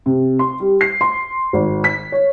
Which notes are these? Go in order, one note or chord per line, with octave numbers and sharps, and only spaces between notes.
C3
C6
G3
C7
C6
G#1
B6
C#5